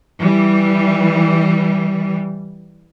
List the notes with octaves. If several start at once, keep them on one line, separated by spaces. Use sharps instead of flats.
E3 G3